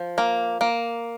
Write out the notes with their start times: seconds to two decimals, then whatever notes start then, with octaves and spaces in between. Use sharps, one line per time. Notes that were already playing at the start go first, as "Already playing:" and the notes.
Already playing: F3
0.18 A#3
0.61 A#3